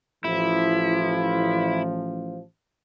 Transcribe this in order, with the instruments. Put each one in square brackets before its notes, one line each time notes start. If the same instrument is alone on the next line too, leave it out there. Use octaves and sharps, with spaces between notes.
[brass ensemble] A1 F3 [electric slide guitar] E4